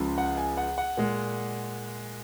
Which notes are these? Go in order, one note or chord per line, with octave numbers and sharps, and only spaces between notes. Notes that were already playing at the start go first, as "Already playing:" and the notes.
Already playing: C#2 C#3 F3 G#3
F#5
G#5
F#5
F#5
A#2 G#3